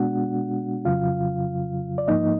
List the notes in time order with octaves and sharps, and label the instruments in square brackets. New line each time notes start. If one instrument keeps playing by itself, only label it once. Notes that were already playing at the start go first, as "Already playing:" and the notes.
Already playing: [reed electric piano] B2 G#3 B3 D4 F#4 F#5
F2 C#3 F#3 F4 F5
D5
G#2 F3 A#3 D#4 D#5